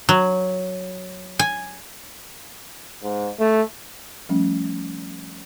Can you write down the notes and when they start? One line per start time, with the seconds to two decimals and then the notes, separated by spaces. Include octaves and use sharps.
0.09 F#3
1.39 G#5
3.03 G#2
3.40 A3
4.29 F3 G3 A3 C#4